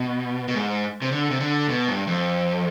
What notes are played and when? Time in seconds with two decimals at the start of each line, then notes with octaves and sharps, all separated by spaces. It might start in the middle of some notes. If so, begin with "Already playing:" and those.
Already playing: B2
0.48 B2
0.55 G#2
1.02 C3
1.12 D3
1.30 C3
1.40 D3
1.69 B2
1.88 G2
2.07 F2